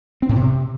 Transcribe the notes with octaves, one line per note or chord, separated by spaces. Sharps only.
C4
A2
C3